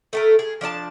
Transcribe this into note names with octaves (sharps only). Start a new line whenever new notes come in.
A3 A4 A#4
G#4
F3 D4 D5 A5